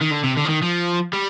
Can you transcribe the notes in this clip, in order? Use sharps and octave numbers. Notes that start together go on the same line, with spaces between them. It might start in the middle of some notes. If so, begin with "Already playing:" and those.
D#3
D3
C3
D3
F3
D#3
F3
G3